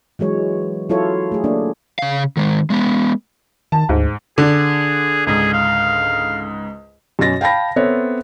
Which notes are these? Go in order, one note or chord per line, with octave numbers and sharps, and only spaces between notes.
E3 F#3 G#3 C#5
F#3 E4 F4 A4 C#5
A3 G#4
A#3 D4
C#3 F5
D#3 G#3
G#3 B3
D#3 A5
D2 G#2
D3 G#4
C#2 G#2 G#4
F5
F#2 B2 C#4 A6 A#6
F5 G5 A5 B5 A#6
B3 C4 A4 C#5 E5